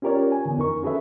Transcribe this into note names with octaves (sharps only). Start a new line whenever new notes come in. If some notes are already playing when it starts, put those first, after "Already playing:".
C#4 F4 G4 A#4 C#5 D5
G#5
D3 D#3 B3
F2 D#4 A#4 C#6
C#4 F#4 G#4 A4 B4 E5